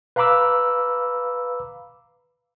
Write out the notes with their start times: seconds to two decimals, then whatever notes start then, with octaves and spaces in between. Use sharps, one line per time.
0.16 B4 F5 A#5 B5 D6 E6